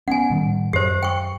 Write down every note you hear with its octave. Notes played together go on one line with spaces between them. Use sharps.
B3 C#4 F#5 G#5
A2 D#3 G3
F#2 G4 C5
G5 C#6